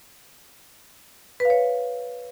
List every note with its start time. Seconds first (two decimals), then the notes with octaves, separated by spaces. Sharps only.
1.40 B4
1.45 F5
1.50 C#5